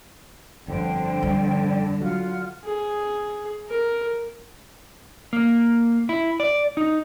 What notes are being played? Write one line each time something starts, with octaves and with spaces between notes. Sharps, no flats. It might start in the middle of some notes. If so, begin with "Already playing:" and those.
G1 F2 D3 C5 G5
G3
F#3 F4 F#5 F6
G#4
A#4
A#3
E4
D5
D#4